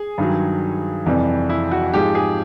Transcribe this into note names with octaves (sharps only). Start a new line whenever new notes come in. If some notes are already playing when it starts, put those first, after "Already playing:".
Already playing: G#4
G2 D#3 F#3
F2 C3 E3 G3
E4
F#4
G#2 F3 G#3 G4
G#4